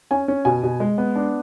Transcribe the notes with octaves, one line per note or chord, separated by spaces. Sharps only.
C#4 G#5
C#4
B2 G#5
B2
G#3
B3
D4